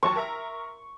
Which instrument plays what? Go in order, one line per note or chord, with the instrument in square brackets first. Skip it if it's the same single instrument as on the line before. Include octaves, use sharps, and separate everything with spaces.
[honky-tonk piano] D#2 F#3 A5 [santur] C#6
[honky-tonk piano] A#4 E5 A#5